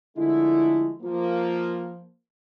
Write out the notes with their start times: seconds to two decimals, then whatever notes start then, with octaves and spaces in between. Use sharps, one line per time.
0.17 D3 F3 G#3 A3 E4
1.02 F3 A#3